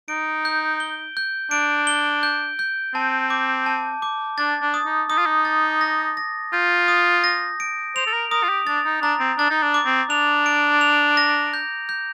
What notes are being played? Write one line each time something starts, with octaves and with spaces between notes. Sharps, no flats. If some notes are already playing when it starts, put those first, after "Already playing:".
D#4 D7
G6
G7
G6
D4 D7
G7
G6
G6
C4 A5
D6
A5
D6
D4 A6
D4
D#6
D#4
D#4 D#6
F4
D#4
A6
A#6
A#6
F4 G6
D#6
A#6
D7
C5 F7
A4
A#4
A#4 D#6
F4
G4
D4 A6
D#4
D4 A#5
C4
D4 A6
D#4
D4
D6
C4
D4 F7
D7
F7
A#6
G6
G6